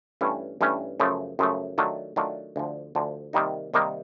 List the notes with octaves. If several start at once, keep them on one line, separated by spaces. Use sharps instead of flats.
G2 E3 A3 C#4
G2 E3 A3 C#4
F#2 C#3 F3 A3
F#2 C#3 F3 A3
D#3 F#3 A3 D4 F4
D#3 F#3 A3 D4 F4
D2 D3 F3
D2 D3 F3
C3 D#3 G3 A#3 D#4
C3 D#3 G3 A#3 D#4